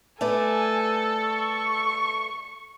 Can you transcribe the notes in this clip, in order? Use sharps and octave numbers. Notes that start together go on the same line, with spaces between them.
A3 A4 B4 D5 G#5
C#6